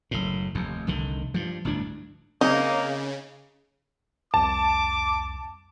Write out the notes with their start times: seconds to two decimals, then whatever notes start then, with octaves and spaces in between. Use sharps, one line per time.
0.11 F#1 A2
0.55 F1 D#2
0.87 F1 C2 D3 D#3
1.34 G2 F3
1.65 G1 D2 A2 D4
2.41 C#3 A#3 C4 D#4
4.34 C2 F2 A5 D6